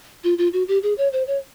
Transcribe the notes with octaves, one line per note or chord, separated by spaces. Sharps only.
F4
F4
F#4
G4
G#4
C#5
C5
C#5